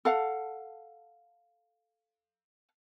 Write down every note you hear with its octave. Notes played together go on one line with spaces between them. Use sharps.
A4 F5 F#5